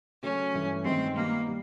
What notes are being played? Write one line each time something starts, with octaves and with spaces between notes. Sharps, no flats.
C#3 F#3 A3 C#4
G2 E3 A3
G2 D#3 G#3 C4
D#3 G3 A#3 B3
G3